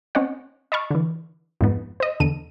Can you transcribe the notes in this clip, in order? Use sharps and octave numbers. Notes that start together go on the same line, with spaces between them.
C4 C#4 C#5 D#5 F#5
D#5 A5 B5 C#6 F6
D3 E3
F2 G#2 B3
C5 D#5
E2 D3 A4 D#7